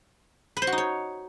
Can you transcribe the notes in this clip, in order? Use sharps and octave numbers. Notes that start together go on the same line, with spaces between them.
B4
C5
F#4
D#4
C#5